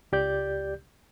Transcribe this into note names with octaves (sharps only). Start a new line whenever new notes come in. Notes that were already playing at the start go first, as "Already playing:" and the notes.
C#2 G4 D5 G6